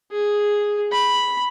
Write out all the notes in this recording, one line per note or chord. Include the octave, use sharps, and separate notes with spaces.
G#4
B5